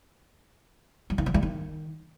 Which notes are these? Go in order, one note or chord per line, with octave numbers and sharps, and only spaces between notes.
F#3
D#3
F3
G2
D#3